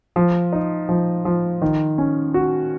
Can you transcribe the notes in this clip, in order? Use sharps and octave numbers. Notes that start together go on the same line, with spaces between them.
F3
D#4
F3
F3
D#3
C#4
F#4